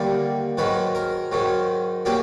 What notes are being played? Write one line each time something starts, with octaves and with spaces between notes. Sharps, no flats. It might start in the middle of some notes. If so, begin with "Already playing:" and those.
Already playing: D#2 D3 G3 A#3
G#2 D#3 F#3 B4
A#4
G#2 D#3 F#3
A#2 F#3 A#3 G4